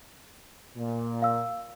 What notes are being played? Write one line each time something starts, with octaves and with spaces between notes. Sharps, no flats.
A#2
F5 E6